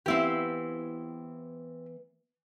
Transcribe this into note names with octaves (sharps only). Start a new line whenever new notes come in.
E3 B3 C4 E4 G4 F5